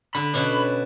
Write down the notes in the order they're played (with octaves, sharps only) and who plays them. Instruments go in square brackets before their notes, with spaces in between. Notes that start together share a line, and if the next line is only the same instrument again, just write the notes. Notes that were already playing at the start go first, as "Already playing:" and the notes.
[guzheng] D3 [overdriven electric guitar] B5
[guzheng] B2 C#4 D4